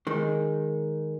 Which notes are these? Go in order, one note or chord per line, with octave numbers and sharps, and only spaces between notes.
D#3 G#3